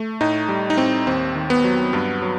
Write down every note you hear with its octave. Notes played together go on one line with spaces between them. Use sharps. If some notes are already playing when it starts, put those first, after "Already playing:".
Already playing: A3
A2 D#4
G3
D#4
A2 C4
D#2 C4
D#3
B3
F#3
G2
F#3